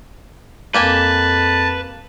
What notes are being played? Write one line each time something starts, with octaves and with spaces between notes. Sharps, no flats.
F2 A#3 G4 B4 G#5 A5